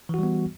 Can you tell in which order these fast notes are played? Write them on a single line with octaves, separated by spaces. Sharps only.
E3 F#4 G3 B3